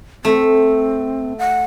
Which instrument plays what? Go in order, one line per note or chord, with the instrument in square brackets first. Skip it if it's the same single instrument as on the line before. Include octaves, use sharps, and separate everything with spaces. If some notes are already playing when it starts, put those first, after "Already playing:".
[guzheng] A3 [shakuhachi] C4
[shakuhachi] F#5